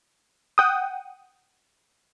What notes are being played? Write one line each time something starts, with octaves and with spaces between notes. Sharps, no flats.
F#5 G5 D#6